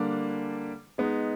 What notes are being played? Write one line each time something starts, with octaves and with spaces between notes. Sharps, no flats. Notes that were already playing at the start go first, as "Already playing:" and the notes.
Already playing: D3 G3 A#3 D4
G#3 B3 D#4